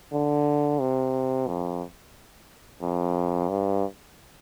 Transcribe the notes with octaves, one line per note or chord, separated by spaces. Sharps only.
D3
C3
F2
F2
G2